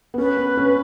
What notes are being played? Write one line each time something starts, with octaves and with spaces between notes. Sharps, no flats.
B3
C#4 B4
B3
C#4